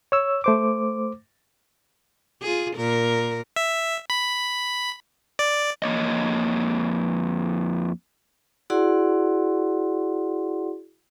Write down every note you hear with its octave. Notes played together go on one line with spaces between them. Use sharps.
C#5 E6
A3 C5 D6
F4 G#4
A#2 A#4
E5
B5
D5
F2 A#3 C#5 D#5
E4 F#4 G#4 D5 F#5 C6